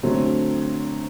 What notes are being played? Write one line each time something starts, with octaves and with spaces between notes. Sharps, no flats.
D3 F#3 A3 C4